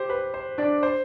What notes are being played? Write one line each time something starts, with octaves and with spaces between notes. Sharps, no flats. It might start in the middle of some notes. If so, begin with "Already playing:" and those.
Already playing: G4 C5
B4
C5
D4 D5
C5